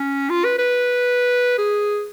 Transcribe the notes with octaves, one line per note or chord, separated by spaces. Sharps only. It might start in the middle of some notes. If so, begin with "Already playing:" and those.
Already playing: C#4
F4
B4
B4
G#4